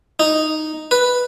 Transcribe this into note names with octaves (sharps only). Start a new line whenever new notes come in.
D#4
B4